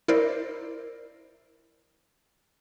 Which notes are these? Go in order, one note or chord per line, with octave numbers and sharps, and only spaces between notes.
E4 A#4 C5 D5